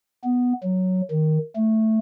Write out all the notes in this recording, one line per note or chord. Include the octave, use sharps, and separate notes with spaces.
B3
F#3
D#3
A3